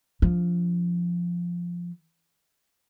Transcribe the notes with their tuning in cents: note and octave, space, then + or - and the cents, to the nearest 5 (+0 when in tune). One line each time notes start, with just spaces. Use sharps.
F3 +0 D4 -40